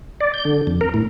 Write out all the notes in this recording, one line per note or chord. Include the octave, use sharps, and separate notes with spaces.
D5
G6
D3
F2
A#4
A2